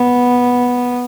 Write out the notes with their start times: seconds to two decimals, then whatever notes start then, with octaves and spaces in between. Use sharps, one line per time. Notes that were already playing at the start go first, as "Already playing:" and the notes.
Already playing: B3